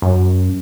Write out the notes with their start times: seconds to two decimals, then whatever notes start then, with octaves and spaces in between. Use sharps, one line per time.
0.02 F#2